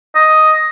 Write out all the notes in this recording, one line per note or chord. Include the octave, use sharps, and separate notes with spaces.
D#5